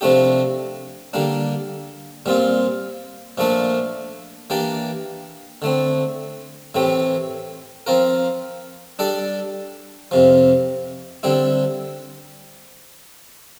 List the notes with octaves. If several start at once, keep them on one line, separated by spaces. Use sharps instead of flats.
C3 F3 A3 D4 G4
D3 G3 A#3 D4
A#2 G3 C4 F4
A#2 F3 A3 D4 A4
E3 A#3 D4 G4 D5
D3 A3 C4
A2 E3 A3 C4 G4
F3 C4 F4 A#4
G3 D4 A4 D5
F2 C3 F3
D3 G3 C4 E4